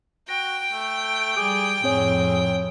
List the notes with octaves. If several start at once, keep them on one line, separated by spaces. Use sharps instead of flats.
F#4 G5 A#6
A3
G3 G#4 D6
F2 A2 C4 G#4 C#5 G#5